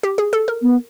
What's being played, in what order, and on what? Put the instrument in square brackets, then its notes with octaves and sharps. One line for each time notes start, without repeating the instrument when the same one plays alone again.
[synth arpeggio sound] G4
G#4
A4
A#4
[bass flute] B3